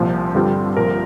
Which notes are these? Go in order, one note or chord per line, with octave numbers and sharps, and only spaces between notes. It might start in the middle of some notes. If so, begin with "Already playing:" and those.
Already playing: C2 A#2 F3
G2 D3 G3 C4 F4
A#1 A#2 F3 A#4